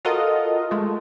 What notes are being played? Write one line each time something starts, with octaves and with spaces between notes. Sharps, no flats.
F4 F#4 A4 A#4 D#5
G#3 A3